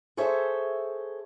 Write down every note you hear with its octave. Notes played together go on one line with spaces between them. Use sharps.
G#4 A4 C5 C#5 E5